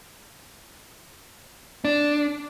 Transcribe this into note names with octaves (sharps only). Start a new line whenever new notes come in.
D4